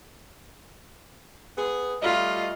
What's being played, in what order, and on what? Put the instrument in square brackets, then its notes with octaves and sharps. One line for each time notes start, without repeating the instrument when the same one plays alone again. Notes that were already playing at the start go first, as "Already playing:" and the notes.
[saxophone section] B3 G#4
[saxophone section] G3 A3 D#5 [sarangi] F4